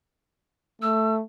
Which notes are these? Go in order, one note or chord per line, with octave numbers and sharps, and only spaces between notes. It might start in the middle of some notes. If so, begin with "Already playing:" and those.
A3 E6